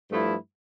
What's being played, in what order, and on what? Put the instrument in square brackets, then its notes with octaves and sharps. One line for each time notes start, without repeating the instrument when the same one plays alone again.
[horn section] G2 F3 A3 E4